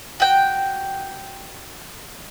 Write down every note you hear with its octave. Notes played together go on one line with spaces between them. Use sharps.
F#4 G5